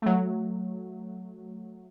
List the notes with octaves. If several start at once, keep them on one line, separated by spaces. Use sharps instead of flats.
F#3 A3